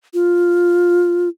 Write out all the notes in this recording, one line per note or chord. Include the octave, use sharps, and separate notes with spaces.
F4